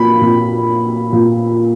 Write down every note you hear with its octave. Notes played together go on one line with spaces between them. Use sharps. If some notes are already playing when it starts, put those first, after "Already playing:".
Already playing: A#2 B5
A#2
A#2